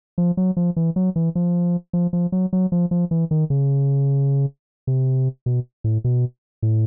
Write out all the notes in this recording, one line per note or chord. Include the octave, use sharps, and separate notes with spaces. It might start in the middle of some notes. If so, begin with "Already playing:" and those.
F3
F#3
F3
E3
F#3
E3
F3
F3
F3
F#3
F#3
F3
F3
E3
D#3
C#3
C3
B2
A2
B2
A2